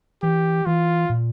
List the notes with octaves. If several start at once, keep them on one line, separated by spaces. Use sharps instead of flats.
E3 G4
E3 F4
A#2